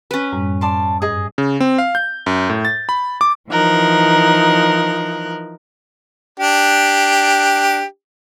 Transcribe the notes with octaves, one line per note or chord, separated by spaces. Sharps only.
C#4 B4
F#2 A2 G3
D5 A5 C6
G2 G#4 D#5
C#3
C4
F5
G6
F#2
A2
A6
B5
D6
E3 F3 D#4 A#4 F#6
D4 G4